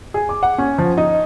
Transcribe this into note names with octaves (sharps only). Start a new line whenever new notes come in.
G#4
D6
F#5
C#4
F3
D#4